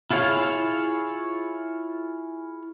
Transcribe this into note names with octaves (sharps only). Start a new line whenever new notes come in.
E4 F4 G#4 C#5 F5